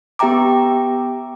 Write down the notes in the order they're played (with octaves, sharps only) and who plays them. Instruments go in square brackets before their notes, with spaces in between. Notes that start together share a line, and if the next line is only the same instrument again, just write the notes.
[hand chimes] B3 G4 E5 G5 A#5 D6